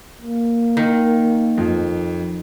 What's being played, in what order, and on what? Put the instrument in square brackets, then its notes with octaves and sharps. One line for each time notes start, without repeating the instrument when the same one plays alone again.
[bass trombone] A#3
[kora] D#3
[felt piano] F2